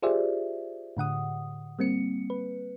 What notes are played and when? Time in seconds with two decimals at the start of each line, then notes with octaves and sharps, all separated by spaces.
0.02 F4 G4 G#4 C5 D5 E5
0.97 A2 D3 F#5 D#6
1.79 G3 A#3 C4 C#7
2.30 B4